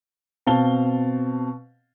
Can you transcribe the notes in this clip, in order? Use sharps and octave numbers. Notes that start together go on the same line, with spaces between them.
B2 C4 F5 A5 G7